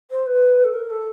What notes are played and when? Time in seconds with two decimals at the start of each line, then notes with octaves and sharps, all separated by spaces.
0.11 C5
0.26 B4
0.64 A4
0.73 A#4
0.90 A4